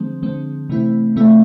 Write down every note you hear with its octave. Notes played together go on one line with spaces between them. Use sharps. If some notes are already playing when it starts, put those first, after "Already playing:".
Already playing: D3 F3 G#3 C4
D3 F3 G#3 C4
C3 E3 A3 C4 E4
C3 E3 A3 C4 E4